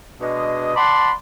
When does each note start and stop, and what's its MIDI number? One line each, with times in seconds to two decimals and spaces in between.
0.21 0.75 47
0.21 0.75 56
0.21 0.75 62
0.21 0.75 75
0.75 1.10 74
0.75 1.10 78
0.75 1.10 81
0.75 1.10 83
0.75 1.10 84